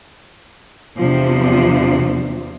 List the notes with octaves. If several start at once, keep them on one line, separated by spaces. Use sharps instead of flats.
E2 C3 F3 D4